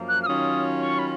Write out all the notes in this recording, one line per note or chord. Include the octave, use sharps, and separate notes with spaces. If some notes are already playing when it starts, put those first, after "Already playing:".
Already playing: F#2 F3 A#3
F#6
F6
D#3 F#3 C#4 F4 D#6
C#6
B5